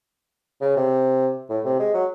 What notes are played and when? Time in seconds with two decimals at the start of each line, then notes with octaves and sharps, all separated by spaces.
0.61 C#3
0.77 C3
1.50 A2
1.65 C3
1.80 G#3
1.94 F#3